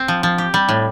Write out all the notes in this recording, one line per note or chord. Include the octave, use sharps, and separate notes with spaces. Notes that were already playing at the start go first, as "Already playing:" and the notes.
Already playing: C4
F3
F3
G4
G3
A2